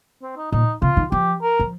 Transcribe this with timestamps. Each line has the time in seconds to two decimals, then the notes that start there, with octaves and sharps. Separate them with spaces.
0.22 C4
0.37 D#4
0.52 A#2 D#4
0.82 C3 F4
0.97 D#3
1.12 F3 G4
1.42 A#4
1.59 F3